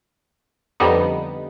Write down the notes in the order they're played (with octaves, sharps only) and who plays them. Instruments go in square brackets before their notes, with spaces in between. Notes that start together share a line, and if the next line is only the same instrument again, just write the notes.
[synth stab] F2 D3 G3 B3 D#4